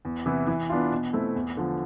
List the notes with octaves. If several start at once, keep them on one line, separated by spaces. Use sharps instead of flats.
E2
C3 E3 B3 E4
E3
B3 D4 F4
B2
A3 C4 E4
E2
D3 F3